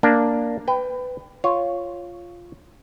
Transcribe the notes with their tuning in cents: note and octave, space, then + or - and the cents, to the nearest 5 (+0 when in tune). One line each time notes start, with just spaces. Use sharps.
A#3 +0 D4 +0
B4 +25 G5 +0
F4 +0 C#5 +0